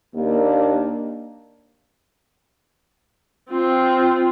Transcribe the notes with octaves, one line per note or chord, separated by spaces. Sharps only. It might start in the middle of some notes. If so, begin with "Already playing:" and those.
D#2 A#3 D4
C4 F4